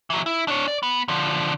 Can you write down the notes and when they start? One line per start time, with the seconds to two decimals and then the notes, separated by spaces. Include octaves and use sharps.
0.10 E3 F#3
0.26 E4
0.48 D4 C#5
0.68 D5
0.83 B3
1.08 D3 F3